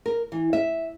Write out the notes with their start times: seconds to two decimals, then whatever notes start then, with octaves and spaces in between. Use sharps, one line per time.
0.06 A#4
0.32 E3
0.53 E5